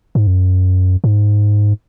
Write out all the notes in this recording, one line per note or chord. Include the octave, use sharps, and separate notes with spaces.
G#2
F#2
G#2